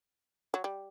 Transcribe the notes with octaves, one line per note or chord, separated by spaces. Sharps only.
F#3
G3